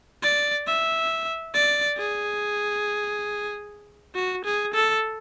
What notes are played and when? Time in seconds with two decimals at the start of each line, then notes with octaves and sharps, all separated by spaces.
0.23 D5
0.67 E5
1.54 D5
1.98 G#4
4.15 F#4
4.45 G#4
4.74 A4